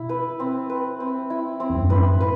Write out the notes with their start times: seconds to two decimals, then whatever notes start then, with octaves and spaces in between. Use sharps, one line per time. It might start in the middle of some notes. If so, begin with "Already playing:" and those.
Already playing: B2 E4
0.09 B4
0.40 C4
0.70 B4
1.00 C4
1.30 E4
1.60 C4
1.70 E2
1.75 F#2
1.84 G2
1.90 F#2 A2 B4
2.20 B4